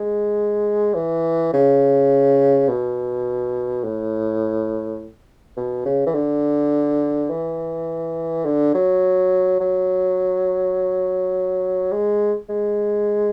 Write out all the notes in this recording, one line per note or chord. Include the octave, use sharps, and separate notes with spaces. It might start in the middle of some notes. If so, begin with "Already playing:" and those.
Already playing: G#3
E3
C#3
B2
A2
B2
C#3
E3
D3
E3
D3
F#3
F#3
G#3
G#3